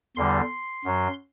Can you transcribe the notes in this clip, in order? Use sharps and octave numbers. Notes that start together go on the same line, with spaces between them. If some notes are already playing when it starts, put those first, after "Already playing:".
E2 D3 G3 C6
F#2 F#3